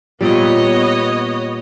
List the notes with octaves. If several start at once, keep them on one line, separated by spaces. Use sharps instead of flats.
A#2 G3 B3 C#5 D#5